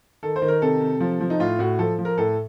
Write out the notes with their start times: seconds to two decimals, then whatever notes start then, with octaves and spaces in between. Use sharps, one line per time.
0.23 D#3 A4
0.36 C5
0.42 D#3
0.48 A#4
0.62 C3 A4
0.81 C3
1.00 F3
1.21 F3
1.30 D#4
1.39 A2 F4
1.59 A2 F#4
1.79 F3 A4
1.98 F3
2.05 A#4
2.18 A2 A4